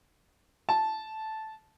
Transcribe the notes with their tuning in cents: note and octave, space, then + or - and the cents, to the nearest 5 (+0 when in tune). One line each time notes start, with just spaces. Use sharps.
A5 -10